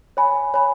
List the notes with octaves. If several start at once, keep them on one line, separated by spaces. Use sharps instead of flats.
C#5 G#5 B5
C#5 G#5 B5